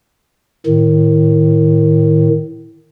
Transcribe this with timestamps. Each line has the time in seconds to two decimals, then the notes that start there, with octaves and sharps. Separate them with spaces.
0.66 A2 D#3